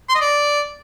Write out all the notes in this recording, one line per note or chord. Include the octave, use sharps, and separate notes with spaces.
C6
D#5
D5